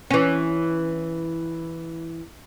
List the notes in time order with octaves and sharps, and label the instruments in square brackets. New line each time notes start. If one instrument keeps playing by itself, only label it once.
[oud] E3 C#4